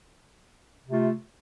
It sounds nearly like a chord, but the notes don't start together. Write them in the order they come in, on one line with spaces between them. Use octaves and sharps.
C3 A3 F4